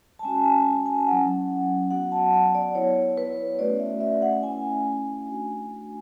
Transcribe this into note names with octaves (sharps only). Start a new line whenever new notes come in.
A5
G#3 C#4 F#4 G#5
G#5
A5
G#5
F#3 C#4 E4 F#5
F#3 B3 F#4 F#5
A5
F#5
D5
B3 E4 C#5
B4
A3 C#4 F#4 D5
E5
E5
F#5
A3 C#4 E4 G#5
A3 D4 F#4